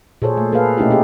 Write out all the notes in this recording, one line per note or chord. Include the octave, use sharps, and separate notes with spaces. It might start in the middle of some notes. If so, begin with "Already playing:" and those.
A#2 G#4 A4 C5 C#5
A3
A#3 G#4 A4 B4 F5
B2 A3 C#4 D#4 E4 G4
C#4 G4 G#4